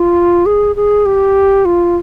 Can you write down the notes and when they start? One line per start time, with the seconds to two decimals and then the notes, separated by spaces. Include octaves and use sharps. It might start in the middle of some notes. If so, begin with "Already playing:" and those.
Already playing: F4
0.46 G#4
0.76 G#4
1.06 G4
1.65 F4